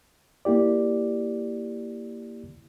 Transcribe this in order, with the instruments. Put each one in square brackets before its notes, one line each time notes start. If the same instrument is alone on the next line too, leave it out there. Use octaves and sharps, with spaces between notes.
[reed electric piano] A#3 E4 G4 D5